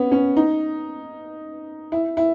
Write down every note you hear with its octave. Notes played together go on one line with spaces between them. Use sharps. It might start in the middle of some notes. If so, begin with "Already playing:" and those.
Already playing: B3 C#4
C#4
D#4
E4
E4